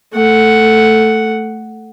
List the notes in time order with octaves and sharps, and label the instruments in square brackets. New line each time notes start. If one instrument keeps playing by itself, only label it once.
[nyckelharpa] A3 F#5